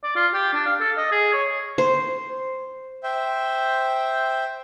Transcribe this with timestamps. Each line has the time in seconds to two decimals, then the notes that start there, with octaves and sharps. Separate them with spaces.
0.04 D5
0.16 F4
0.34 G4
0.54 D4
0.66 F5
0.81 A4
0.97 D#5
1.12 G#4
1.33 C#5
1.78 C5
3.03 C5 E5 G5